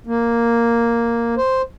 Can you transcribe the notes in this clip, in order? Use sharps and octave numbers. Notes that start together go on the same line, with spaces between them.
A#3
C5